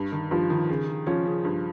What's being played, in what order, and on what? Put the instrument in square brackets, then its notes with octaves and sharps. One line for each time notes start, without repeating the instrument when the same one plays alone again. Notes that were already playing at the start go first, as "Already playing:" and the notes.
Already playing: [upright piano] G2
D#3
[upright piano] G2 [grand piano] F3
[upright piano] D#3
C#3
C#3
[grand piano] F3 [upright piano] C#4
[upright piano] C#3
G2